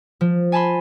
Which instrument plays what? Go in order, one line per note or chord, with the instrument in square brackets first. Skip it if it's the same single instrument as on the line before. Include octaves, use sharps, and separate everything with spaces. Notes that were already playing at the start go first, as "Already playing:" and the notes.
[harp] F3
G#5 A5 B5 C6